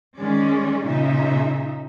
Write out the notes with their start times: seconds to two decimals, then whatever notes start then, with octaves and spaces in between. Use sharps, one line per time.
0.18 D#3 G#3 C#4 D5
0.86 A#2 C#3 D#4 E5